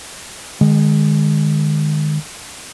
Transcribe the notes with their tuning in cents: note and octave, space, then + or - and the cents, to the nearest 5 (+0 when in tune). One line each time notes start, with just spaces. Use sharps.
D#3 -35 G#3 +0